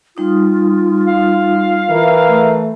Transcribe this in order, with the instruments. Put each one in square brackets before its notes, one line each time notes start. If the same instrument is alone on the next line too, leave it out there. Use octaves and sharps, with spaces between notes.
[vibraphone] G3 D#4 D#6 [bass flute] F4
[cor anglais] F5
[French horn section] E3 A#4
[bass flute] A3